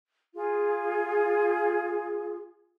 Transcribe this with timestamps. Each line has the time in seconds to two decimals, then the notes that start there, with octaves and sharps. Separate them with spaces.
0.34 F4 G#4